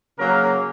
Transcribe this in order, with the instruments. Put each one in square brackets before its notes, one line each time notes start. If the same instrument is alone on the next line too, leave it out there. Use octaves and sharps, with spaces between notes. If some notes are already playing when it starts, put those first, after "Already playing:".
[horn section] C#3 F#3 A#3 C#4 A#4